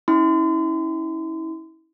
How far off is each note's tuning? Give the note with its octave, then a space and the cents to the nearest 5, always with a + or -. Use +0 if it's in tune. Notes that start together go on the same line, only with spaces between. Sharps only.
C#4 +0 E4 -30 C6 -35